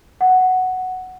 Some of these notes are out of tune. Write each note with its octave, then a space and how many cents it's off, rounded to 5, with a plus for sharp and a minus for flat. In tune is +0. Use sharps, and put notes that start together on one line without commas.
F#5 +0